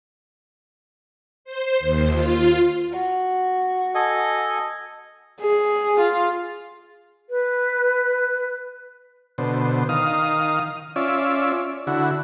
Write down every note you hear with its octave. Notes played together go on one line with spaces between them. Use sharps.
C5
D#2
F4
F#4
A4 D#5 G#5
G#4
F4
B4
B2 D3 C5
D#3 F5 D#6
C#4 F4 D5 E5
D3 E4 F#4